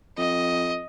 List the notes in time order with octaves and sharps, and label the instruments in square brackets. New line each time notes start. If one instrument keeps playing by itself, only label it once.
[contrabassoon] F2 [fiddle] D#5